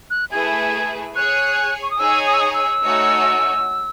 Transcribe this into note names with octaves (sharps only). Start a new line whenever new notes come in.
F#6
A3 E4 G#4 B4 G#6
G#4 C#5 G#5 F#6
C#6
D#6
D#4 G#4 C#5 G#5 E6
D#6
E6
D#6
E6
A3 D#4 F#4 C#5 G#5